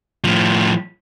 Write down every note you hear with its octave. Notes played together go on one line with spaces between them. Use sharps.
A2 F3